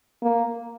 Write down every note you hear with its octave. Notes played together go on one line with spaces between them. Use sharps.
A#3